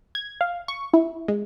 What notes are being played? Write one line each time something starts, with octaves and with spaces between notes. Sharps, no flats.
G#6
F5
C#6
E4
G#3